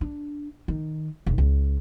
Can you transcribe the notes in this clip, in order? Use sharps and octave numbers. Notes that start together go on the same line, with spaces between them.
D4
D#3
E1
C#2